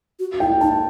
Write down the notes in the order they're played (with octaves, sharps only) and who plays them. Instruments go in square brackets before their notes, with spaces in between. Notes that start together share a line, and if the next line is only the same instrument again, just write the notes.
[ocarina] F#4
[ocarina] E4 [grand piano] G5
[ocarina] D#4 [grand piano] A5